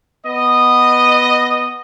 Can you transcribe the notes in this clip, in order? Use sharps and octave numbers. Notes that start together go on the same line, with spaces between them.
B3 D#5